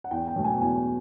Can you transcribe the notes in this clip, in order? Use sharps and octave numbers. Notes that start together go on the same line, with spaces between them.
F#5
E2 G5
G5
B2 F#3 A3
G#5
E2 G#5